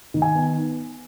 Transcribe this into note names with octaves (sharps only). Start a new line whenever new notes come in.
D#3
G#5
B3